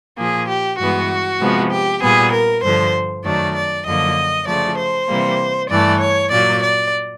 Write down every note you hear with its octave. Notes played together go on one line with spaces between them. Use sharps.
A#2 F3 A#3 G#4
G4
G2 E3 G#3 B3 F#4
C3 F3 G#3 B3
G4
A#2 G3 B3 G#4
A#4
G2 D3 F3 C5
F#2 D#3 F#3 A3 D5
D5
F#2 D3 F3 A#3 D#5
C#3 F3 A3 D5
C5
C3 E3 G3 A#3
G2 E3 A3 D5
C#5
A#2 F#3 A#3 D5
D5